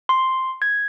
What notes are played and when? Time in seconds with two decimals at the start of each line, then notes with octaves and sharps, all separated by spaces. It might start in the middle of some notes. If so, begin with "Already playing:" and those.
0.09 C6
0.62 G#6